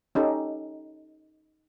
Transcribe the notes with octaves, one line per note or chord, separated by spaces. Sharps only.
C#4 D#4 G4 A4